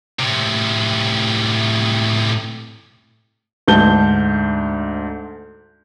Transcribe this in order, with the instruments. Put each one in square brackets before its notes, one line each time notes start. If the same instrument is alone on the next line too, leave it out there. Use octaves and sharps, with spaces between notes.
[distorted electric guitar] A2 C3
[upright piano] D2 G#2 A5 G6 G7